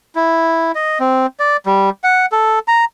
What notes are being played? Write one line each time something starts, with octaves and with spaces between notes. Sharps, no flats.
E4
D#5
C4
D5
G3
F#5
A4
A#5